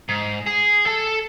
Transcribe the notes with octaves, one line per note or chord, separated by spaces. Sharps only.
G#2
G#4
A4 A5